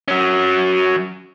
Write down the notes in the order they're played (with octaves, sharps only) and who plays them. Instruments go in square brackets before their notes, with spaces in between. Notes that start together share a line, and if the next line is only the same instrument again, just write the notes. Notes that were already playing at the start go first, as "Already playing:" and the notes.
[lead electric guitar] F#3 C#4